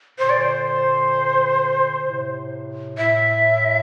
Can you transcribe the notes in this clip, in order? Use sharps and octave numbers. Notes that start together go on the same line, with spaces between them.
A#2 D3 C5
D5
C5
A2 C3
A2 E5